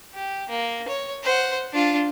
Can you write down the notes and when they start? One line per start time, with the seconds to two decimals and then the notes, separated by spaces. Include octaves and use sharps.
0.14 G4
0.49 A#3
0.88 C#5
1.23 C5 F#5
1.73 D4 F4